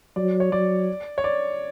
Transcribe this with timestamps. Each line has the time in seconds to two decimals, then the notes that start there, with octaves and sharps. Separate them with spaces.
0.16 F#3 D5
0.40 C#5
0.52 F#3 D5
1.18 C#5
1.24 D5